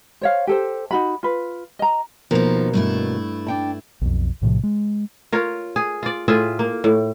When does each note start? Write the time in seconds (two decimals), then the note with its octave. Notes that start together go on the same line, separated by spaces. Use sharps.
0.21 C5 C#5 F5
0.47 G4 A4 C5
0.91 D#4 F#4 B5
1.23 F4 B4
1.79 D#5 A#5
2.31 D#2 B2 F3 D#4 A#4
2.74 G2 A3 E4
3.47 D4 G5 A5
4.01 B1 F2
4.41 B1 A2 C3 F3
4.63 G#3
5.32 F4 A#4 C#5
5.76 G#4
6.03 F4 D5
6.28 A2 F4 G#4 E5
6.59 A#3
6.84 A2